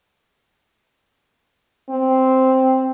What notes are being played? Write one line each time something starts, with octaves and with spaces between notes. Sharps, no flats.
C4